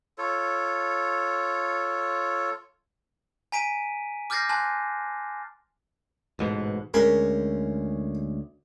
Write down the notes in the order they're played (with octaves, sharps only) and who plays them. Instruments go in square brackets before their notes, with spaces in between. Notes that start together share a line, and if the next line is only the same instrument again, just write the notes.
[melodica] F4 A4 C#5
[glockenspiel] G#5 A#5 B6 D7 D#7
D6 F6 G6 A6 A#6 C7
G#5 A5 C6 F#6
[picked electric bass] A1 G#2 B2
[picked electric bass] D2 G#3 C#4 [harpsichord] A#4